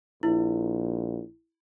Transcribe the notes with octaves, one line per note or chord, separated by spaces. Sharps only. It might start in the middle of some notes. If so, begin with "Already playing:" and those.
A#1 E4